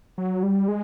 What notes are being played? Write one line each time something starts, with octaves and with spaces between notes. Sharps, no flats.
F#3
G3
G#3